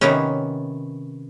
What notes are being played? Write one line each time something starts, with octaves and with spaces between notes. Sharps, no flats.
C3 D#3 B3 C#4